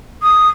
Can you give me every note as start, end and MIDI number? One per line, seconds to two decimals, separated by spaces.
0.23 0.49 87